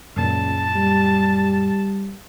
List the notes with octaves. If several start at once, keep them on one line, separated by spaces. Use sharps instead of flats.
C#2 F#2 A#2 A5
G3